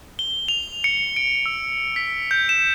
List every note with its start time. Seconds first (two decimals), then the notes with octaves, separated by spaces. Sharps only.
0.19 G7
0.48 F7
0.84 C#7
1.17 D7
1.46 E6
1.96 B6
2.31 G6
2.49 E7